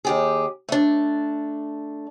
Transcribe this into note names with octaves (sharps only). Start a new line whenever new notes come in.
D#2 G4 G#4
A3 D4